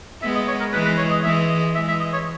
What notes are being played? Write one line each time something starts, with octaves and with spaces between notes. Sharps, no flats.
G#3 B3 E5
D#5
C#5
A#4
E3 G#3 B4
B4
C#5
D#5
E3 G#3 E5
D#5
E3 G#3 E5
E5
D#5
C#5